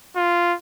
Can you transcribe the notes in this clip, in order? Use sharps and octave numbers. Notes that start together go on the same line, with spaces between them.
F4